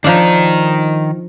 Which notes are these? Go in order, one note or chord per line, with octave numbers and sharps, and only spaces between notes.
D#3 F3 D4 A#5